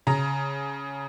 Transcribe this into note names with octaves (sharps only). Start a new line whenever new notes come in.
C#3 A#5